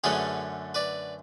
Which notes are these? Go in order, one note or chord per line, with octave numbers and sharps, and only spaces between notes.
F#2 D3 A3 C#4 G#4 B4
B4 D5